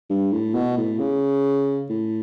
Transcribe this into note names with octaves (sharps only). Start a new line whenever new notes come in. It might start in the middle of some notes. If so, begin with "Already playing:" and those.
G2
A2
B2
A2
C#3
A2